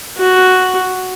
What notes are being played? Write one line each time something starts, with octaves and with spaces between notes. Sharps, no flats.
F#4